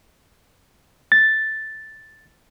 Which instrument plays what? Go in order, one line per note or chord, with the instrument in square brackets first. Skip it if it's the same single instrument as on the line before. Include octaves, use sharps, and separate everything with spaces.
[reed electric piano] A6